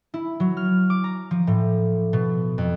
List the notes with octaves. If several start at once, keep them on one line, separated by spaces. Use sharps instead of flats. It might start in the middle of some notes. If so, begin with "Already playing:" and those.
E4
F#3
F6
D6
A#5
F3
A2
B2
F2